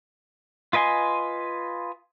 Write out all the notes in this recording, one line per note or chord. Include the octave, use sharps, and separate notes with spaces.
F4 B4 D#5 G#5 C6